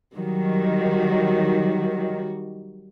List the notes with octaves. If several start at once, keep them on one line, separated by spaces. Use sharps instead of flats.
D#3 F#3 G3 F#4